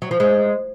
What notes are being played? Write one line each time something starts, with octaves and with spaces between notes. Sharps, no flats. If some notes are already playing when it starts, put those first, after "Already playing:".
F#3
F3
G#3